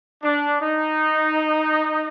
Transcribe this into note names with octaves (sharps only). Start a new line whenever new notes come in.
D4
D#4